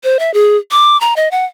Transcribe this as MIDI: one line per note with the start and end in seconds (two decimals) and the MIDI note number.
0.04 0.17 72
0.19 0.32 76
0.34 0.57 68
0.71 0.99 86
1.01 1.14 82
1.16 1.31 75
1.31 1.45 78